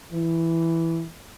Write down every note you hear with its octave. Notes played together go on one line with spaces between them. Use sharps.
E3